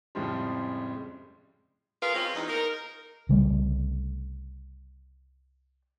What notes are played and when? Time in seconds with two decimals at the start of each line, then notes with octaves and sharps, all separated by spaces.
0.15 F2 A2 C#3 F3 G3 G#3
2.02 F4 G#4 A#4 B4 F5
2.15 G#3 C4 C#4 F4
2.35 E2 D#4
2.48 D#4 A#4
3.29 C2 C#3 G3 A3